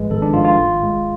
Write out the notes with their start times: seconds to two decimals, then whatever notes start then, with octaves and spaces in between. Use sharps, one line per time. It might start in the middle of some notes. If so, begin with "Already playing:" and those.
Already playing: G#1 G#2 F3 G#3 B4
0.11 G#1 A4
0.22 D4
0.33 G#2 F3 G#3 F4
0.45 F4
0.56 G#1
0.80 G#2 G#3